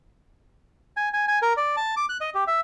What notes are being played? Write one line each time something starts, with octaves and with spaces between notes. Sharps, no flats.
G#5
G#5
G#5
A#4
D5
A5
D6
F#6
D#5
G4
E5